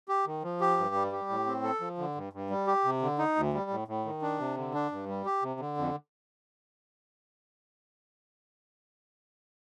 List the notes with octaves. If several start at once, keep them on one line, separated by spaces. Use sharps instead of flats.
G4
D#3
F3
G4
G2
G3
G4
A2
C4
A4
F3
D3
G2
G2
G3
G4
C3
D3
D#4
D2
G3
A2
A2
D#3
D4
C3
D3
D4
G2
G3
G4
C3
D3
F2